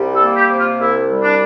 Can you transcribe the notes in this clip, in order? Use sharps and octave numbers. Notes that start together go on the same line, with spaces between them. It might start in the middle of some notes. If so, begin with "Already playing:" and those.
Already playing: C2 G3
A4
A#3
G4
C3
F4
C2 E4
G3
D4